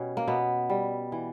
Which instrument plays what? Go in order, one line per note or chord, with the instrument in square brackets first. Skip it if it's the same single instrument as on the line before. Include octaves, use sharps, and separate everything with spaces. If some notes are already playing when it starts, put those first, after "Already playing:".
Already playing: [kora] B2 G3 C#4
A#3
B2 B3
G3
E3